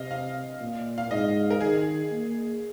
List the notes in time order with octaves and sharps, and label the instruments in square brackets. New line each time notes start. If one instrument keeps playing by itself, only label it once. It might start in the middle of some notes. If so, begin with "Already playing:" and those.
Already playing: [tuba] C3 [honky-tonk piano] D#5 F5
[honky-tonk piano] F5
[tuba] A#2
[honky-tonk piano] F5
[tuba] G#2 [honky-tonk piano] D#5
[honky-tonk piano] A#4
[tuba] D#3 [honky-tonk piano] G#4
[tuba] A#3